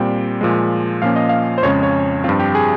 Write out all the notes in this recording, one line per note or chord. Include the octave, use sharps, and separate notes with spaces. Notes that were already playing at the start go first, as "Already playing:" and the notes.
Already playing: A#2 G3 C4 G5
A#2 F3 G#3
A#2 F3 A#3 C#4 F5
D#5
F5
C5
F2 C#3 G#3 C#4 C#5
C#5
G2 F3 C4 F4
G4
G#4